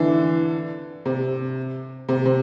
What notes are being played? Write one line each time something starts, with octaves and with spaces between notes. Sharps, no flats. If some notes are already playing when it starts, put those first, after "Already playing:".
Already playing: D3 E3
C3
C3
C3